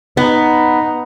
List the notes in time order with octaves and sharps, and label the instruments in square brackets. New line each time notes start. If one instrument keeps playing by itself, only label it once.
[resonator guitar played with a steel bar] B3 [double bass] D#4